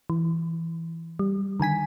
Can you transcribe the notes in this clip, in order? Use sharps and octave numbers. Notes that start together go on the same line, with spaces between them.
E3
G3
D3 D#3 G#5 B6